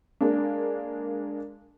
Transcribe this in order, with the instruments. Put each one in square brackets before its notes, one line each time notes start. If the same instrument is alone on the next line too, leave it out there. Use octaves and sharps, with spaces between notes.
[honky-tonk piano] G#3 A#3 D4